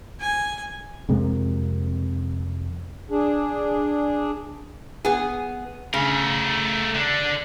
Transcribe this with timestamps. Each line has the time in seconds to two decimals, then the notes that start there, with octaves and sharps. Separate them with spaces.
0.20 G#5
1.09 F2 C3 G#3 A#3
3.10 D4 G#4
5.05 B3 G#4
5.94 C#3 A3 A#4
6.95 D3 D4